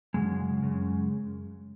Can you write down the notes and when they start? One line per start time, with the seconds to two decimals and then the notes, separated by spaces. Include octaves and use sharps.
0.14 F#2 C#3 G#3
0.63 F#2 C#3